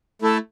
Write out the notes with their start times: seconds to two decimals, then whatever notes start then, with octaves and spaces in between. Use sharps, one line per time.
0.22 A3 E4 A4